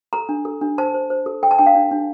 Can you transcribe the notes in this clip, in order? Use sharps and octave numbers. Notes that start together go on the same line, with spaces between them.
A4 A#5
D4
A4
D4
C5 A5
C5
C5
A4
A4 G5
A5
D4 G5
F5
D4
D4